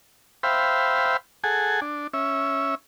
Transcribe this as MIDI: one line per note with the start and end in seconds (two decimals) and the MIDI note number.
0.43 1.17 72
0.43 1.17 76
0.43 1.17 77
0.43 1.17 79
0.43 1.17 83
1.44 1.80 68
1.44 1.80 69
1.44 1.80 78
1.44 1.80 80
1.81 2.07 62
2.14 2.75 61
2.14 2.75 76